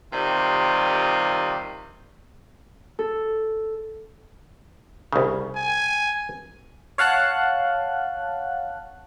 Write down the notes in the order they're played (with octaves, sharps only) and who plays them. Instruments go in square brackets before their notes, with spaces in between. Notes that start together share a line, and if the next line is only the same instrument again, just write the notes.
[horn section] C3 D#3 G3 F4
[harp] A4
[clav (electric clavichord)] C2 C#3
[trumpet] G#5
[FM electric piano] C#5 F5 F#5 A5 F#6